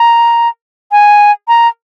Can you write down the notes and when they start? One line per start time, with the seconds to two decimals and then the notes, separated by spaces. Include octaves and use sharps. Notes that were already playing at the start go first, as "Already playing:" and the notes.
Already playing: A#5
0.92 G#5
1.48 A#5